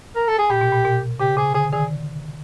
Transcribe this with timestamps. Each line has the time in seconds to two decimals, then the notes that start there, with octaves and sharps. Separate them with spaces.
0.15 A#4
0.28 A4
0.38 G#4
0.50 A#2 G4
0.61 B2
0.72 A#2
0.85 B2
1.20 C#3 G4
1.37 C#3 G#4
1.54 D3 G#4
1.72 D#3 G#4